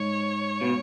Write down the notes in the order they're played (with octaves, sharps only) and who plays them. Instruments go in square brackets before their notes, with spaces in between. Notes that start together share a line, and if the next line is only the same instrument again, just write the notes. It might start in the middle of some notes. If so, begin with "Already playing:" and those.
Already playing: [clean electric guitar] G#2 [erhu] C#5
[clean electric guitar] B2